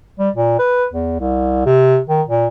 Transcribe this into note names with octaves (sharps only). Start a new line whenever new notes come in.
G3
A#2
B4
E2
C2
C3
D#3
A#2